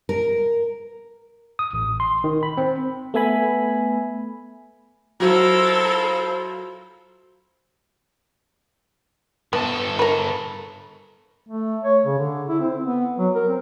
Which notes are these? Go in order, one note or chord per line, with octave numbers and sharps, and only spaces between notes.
A#4
D#6
A1
C6
D#3
B5
C4
A3 B3 E5 G#5 B5
F#3 E4 F4 A4 A#4 C5
G2 B3 A4
A#4 B4
A3
C#5
C#3
D3
E4
C4
B3
F#3
A#4
C4